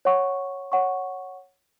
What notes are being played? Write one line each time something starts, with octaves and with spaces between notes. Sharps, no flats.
C#5 F#5 C#6
C#5 F#5 C#6